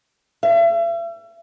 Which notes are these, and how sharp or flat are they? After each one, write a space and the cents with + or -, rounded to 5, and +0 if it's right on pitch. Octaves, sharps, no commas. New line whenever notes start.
E5 +40